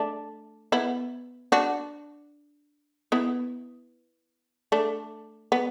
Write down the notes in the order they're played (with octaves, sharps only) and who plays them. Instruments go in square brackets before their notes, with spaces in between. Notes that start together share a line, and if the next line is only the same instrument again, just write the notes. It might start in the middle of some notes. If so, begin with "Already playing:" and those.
Already playing: [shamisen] A3 D4
B3 E4
D4 F#4
B3 E4
A3 D4
B3